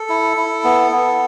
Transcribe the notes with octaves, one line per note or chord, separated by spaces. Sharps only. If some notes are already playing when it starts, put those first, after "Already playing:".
Already playing: A4
E4
E4
B3
B3